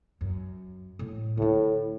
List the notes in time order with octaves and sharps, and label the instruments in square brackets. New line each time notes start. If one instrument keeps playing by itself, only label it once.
[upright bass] F#2
A2
[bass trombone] A2 [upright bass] D3 D4